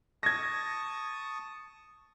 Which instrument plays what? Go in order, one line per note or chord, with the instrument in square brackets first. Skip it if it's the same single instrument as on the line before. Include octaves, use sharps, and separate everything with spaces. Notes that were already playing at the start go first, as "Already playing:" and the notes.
[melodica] A5 C#6 D#6 [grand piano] G#6 A#6